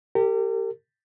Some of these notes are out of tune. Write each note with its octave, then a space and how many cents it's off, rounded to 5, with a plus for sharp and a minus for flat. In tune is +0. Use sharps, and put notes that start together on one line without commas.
G4 +0 A#4 -40